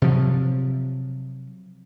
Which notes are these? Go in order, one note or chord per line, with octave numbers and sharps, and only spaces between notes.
C3 F3 F#3